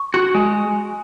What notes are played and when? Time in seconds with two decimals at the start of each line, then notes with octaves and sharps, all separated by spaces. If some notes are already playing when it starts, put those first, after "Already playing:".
Already playing: C#6
0.14 F#4
0.35 G#3